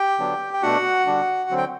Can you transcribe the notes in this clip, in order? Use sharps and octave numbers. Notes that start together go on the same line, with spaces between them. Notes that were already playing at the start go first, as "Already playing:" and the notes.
Already playing: G4 G5
D3 F#3 B3 D4
G5
B2 A3 D4 F#4 F#5
D3 G3 D4
D3 F#3 C4
G5